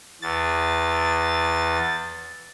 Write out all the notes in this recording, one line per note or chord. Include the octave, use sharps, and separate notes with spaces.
E2 A6